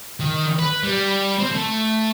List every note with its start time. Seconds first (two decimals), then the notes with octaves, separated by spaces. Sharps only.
0.20 D#3
0.59 B4
0.84 G3
1.39 C4
1.52 A3